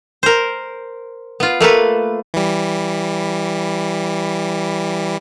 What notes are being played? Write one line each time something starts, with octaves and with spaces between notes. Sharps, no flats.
A#4 C5
B3 F4
A3 A#3 A4 B4
E3 G3